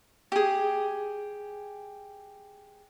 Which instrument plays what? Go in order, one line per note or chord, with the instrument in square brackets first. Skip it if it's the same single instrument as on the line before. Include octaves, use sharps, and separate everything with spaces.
[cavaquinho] G4 G#4